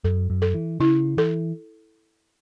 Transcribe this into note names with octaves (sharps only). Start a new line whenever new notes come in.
F#2 A4
F#2
A4
E3
C#3 E4
E3 A4